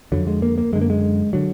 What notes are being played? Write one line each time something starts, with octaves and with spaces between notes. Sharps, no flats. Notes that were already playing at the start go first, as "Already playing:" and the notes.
F2 D3 F#3
G#3
A#3
A#3
F#2 D3 G#3
A#3
G#3
D3 F#3